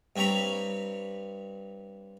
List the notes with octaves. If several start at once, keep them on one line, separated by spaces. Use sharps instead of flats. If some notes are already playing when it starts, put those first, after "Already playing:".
G2 C4 C#5 A#5 B5